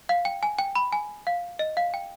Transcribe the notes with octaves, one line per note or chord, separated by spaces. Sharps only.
F5
G5
G#5
G5
B5
G#5
F5
D#5
F5
G5